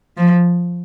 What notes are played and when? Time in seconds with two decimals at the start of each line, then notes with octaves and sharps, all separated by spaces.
0.17 F3